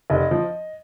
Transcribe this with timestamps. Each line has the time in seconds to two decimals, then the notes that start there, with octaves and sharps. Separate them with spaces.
0.10 F1 D#5
0.31 F3